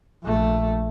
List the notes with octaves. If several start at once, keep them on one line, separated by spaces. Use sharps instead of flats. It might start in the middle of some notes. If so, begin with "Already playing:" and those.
A#1 A3